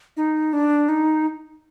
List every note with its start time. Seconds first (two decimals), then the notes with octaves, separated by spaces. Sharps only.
0.17 D#4
0.53 D4
0.89 D#4